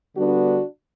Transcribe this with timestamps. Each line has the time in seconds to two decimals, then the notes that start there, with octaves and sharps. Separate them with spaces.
0.16 D3 G3 B3 D4 F#4